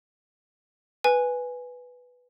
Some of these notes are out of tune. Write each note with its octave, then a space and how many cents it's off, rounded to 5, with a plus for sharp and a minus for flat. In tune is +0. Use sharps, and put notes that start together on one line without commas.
B4 +0 G#5 +0